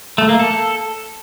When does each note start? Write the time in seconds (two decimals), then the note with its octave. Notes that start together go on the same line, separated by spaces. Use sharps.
0.18 A3
0.29 A#3
0.39 A4